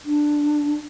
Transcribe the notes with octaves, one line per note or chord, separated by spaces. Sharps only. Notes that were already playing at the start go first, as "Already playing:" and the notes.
D4